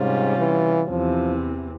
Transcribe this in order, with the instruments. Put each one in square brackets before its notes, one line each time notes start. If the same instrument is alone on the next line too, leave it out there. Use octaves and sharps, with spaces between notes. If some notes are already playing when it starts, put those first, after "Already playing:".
Already playing: [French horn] G#2 [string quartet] C3 G3 C#4 F4
[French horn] E3
[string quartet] E2 C3 E3 [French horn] F3